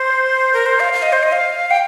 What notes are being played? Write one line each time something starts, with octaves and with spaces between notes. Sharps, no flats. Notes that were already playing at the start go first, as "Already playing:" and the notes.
Already playing: C5
A#4
C5
F5
F5
D#5
C5
D#5
F5
G5